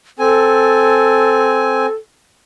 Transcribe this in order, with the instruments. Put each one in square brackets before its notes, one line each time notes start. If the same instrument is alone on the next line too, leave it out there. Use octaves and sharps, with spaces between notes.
[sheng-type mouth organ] C4 G#5 [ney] A4